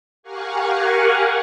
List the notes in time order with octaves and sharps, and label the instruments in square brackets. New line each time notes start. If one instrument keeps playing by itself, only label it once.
[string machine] G4 A#4 F5 F#5 G#5 C#6